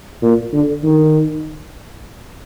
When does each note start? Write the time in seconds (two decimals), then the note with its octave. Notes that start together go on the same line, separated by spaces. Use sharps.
0.22 A#2
0.53 D3
0.83 D#3